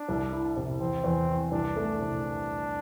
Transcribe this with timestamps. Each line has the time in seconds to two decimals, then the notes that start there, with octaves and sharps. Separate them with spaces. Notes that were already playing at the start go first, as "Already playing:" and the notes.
Already playing: D4
0.08 C2
0.32 E4
0.56 C3
0.80 E2 C4
1.04 E2
1.28 E3
1.52 C2 D4
1.76 A3
2.00 C3